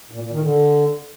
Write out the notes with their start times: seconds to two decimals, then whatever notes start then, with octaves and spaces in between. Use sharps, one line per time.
0.11 A#2
0.22 A#2
0.32 D#3
0.42 D3